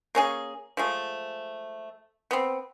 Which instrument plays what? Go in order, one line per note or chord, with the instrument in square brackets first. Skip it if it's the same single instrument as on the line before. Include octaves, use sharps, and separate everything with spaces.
[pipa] A#3 C#4 G#4
F3 G#3 A3
B3 C4